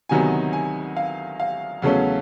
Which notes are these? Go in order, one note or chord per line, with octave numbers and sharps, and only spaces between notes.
D2 C3 D#3 F#3 B3 G#5
G#5
F5
F5
E2 C#3 F#3 A3 C#4